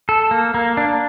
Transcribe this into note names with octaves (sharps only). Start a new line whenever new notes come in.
A4
A#3
A#3
D4